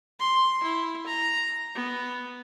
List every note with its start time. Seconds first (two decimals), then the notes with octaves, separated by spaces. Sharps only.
0.19 C6
0.63 E4
1.06 A#5
1.75 B3